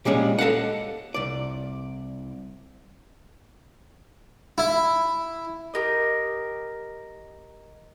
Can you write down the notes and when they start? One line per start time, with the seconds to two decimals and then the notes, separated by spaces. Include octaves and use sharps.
0.05 A#2 G3 G#3 C#4
0.39 A4 D#5 F5 F#5
1.14 C2 D5
4.58 E4
5.74 G4 A#4 D#5